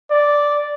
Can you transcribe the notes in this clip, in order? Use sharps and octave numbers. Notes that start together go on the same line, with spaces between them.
D5